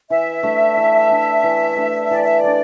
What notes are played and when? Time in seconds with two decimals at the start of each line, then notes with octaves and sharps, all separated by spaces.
0.10 E3 E5
0.43 A3 D4
0.77 E3
1.10 A3 D4
1.43 E3
1.77 A3 D4
2.10 E3 D5
2.23 E5
2.37 D5
2.43 A3 D4